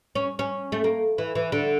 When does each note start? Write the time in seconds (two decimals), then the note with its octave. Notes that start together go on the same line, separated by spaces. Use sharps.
0.15 C#4
0.39 C#4
0.72 A3
0.84 A#3
1.18 E3
1.35 E3
1.52 D3